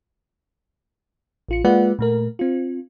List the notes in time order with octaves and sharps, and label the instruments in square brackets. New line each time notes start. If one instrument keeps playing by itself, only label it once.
[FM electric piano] A1 F4 C#7
G#3 A#3 F4 B4 D5 F#5
A#2 A3 A#4
C4 F4